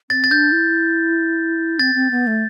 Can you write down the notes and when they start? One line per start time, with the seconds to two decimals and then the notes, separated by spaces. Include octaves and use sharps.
0.10 C4 A6
0.24 A6
0.31 D4 G6
0.52 E4
1.79 C4 A6
1.95 C4
2.11 B3
2.27 A3